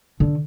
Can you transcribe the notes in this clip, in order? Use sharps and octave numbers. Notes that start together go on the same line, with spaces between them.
D3